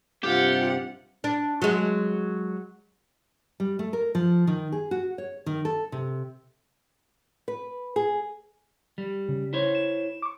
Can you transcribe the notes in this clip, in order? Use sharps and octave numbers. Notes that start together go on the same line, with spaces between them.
G2 C3 F4 G4 F#5
D4
F#3 G#3
G3
A3
A#4
F3
D#3
G#4
F#4
C#5
D#3
A4
C3
B4
G#4
G3
C#3
E4 C5 C#5
E7
C#6 D6